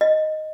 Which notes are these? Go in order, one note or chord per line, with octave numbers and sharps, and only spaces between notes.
D#5